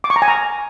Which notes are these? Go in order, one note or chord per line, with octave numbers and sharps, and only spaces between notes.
D6
C#6
A#5
G#5
A#5